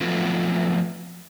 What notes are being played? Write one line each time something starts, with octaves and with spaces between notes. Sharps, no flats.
F3 F#3 A3 B3 C4 F4